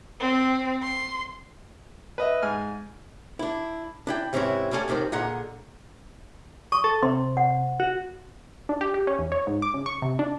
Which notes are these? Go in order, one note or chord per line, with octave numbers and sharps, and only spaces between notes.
C4
C6
B4 D#5 E5
G#2 G#5 F6
D4 E4
D4 E4 G5
G#2 C3 E3 C4 C#4 E4
D2 G3 C#4 F4 A4 G#5
C#2 C3 D#3 D4 C5
A#2 D3 G#4 D#5 F#5 A#5
C#6 D#6
A4
C3 C6
F#5
F#4
D4
G4
G4
C#4
E2
C#5
G#2
D6
C#3
C#6
C3
D4